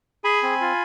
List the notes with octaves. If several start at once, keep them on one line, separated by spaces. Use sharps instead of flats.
G#4 G#5 B5
C4
F4